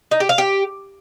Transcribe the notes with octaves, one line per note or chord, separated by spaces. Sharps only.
D#4
G4
F5
G4